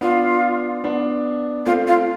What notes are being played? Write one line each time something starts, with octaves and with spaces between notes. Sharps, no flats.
B3 D4 F4
B3 D4
A3 C4 F4
F4